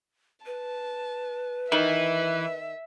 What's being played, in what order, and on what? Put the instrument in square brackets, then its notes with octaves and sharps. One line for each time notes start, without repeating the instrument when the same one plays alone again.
[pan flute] B4 [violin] A5
[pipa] D#3 [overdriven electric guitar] E3 [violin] E5